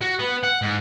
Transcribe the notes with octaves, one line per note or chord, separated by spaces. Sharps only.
F#4
B3
F#5
G#2